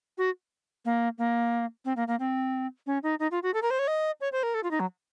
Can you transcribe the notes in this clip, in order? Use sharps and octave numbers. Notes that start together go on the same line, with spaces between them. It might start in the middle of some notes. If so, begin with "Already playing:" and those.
F#4
A#3
A#3
C4
A#3
A#3
C4
C#4
D#4
D#4
F4
F#4
A4
A#4
C5
C#5
D#5
C#5
C5
A#4
A4
F4
D#4
F#3